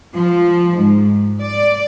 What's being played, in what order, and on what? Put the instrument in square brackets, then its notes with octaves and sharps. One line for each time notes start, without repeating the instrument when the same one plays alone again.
[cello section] F3
G#2
D5